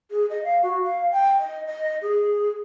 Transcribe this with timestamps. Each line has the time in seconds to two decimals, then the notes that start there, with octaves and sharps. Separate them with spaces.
0.11 G#4
0.30 D#5
0.45 F5
0.63 F#4
0.84 F5
1.12 G5
1.39 D#5
1.66 D#5
2.02 G#4